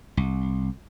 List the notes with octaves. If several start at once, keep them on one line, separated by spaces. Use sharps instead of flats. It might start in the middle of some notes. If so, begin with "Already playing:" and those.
C2